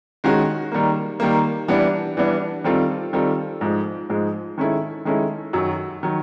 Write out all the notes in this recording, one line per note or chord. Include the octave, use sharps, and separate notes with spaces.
D#3 G#3 C#4 F#4
D#3 G3 A#3
D#3 G3 A#3
E3 G3 B3 D4
E3 G3 B3 D4
D#3 G3 C4 F4 A4
D#3 G3 C4 F4 A4
G#2 F3 G#3
G#2 F3 G#3
D#3 G#3 C#4 E4 A4
D#3 G#3 C#4 E4 A4
F#2 D#3 F#3
D#3 F#3